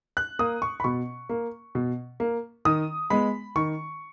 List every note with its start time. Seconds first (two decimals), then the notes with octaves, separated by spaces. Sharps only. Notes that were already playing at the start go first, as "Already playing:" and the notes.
0.17 F#6
0.39 A#3 D#6
0.62 C#6
0.80 B5
0.84 B2 C#6
1.29 A#3
1.75 B2
2.20 A#3
2.65 D#3 D#6
3.10 G#3 B3 B5
3.56 D#3 C#6